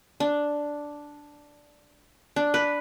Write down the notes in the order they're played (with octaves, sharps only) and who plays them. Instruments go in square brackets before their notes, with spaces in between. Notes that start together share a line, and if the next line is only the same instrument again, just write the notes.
[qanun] D4
D4
B4